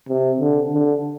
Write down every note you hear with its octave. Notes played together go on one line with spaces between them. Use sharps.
C3
D3
D3